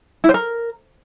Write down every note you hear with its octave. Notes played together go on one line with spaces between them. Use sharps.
E4
C5
A#4